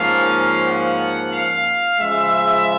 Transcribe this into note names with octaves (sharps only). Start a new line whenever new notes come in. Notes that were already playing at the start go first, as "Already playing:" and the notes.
Already playing: G#2 F3 A#3 C#4 F5
F#5
F5
C#3 F3 G#3 E5